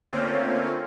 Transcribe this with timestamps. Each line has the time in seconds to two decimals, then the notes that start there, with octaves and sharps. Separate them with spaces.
0.13 D3 A3 A#3 C4 C#4 F4